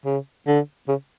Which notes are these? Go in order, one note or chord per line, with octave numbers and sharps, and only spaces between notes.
C#3
D3
C#3